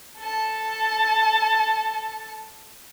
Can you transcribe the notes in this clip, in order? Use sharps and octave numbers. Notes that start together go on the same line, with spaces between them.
A4 A5